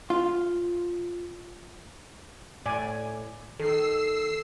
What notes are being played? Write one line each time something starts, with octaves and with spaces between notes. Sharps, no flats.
F4
A2 D5 G#5
D#3 A4 E6 C7